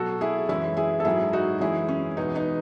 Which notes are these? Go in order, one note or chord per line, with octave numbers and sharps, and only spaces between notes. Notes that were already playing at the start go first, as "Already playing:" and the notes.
Already playing: B2 F#3 F#4 A4
E4 G#4
F#2 E3 G#3 C#4 E4
E4 G#4
A4
G#2 F#3 E4 G#4
D#4 F#4
F#2 E3 G#3 E4 G#4
C#4
E2 B2 G#3 B3 D#4
B3 D#4